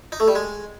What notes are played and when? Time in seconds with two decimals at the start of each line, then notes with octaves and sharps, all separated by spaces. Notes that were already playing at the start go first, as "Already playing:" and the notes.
0.12 D#4
0.20 A3
0.28 G3
0.35 G#3